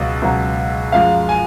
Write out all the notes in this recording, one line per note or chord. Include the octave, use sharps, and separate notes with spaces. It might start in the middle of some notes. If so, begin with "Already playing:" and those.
Already playing: C#2 B2 F#3
C#2 B2 F#3
F#2 F3 G#3 F5
G#5